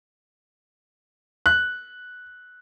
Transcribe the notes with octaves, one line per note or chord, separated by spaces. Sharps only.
F#6